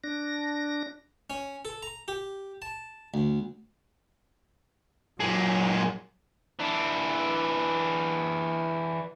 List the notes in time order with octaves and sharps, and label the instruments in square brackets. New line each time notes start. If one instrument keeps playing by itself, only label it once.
[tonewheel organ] D4 A#6
[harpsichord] C#4
A4
A#5
G4
A5
D2
[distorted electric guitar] A#2 G#3 [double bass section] F#3
[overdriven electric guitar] E3 D4